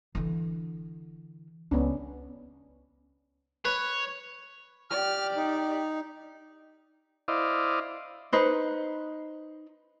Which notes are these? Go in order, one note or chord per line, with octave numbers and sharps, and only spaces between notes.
D3 E3
C#2 B3 C#4 D4
B4 C#5
G4 D5 F6
D#4
E4 C5 D5 D#5 F5
D#4 B4 C5